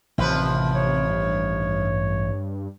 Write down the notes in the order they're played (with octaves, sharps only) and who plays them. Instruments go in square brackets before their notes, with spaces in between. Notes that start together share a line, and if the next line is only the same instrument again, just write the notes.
[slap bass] A1 [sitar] D#2 F3 B4 [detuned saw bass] C3
[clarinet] C#5
[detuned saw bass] G2